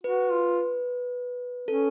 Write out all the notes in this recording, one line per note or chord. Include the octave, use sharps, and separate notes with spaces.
F#4 B4
F4
C#4 A4